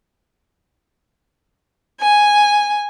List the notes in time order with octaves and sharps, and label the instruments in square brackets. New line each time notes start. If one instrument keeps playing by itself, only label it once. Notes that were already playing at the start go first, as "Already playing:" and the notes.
[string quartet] G#5